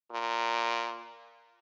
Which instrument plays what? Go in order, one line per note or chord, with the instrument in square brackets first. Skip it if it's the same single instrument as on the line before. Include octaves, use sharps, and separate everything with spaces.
[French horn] A#2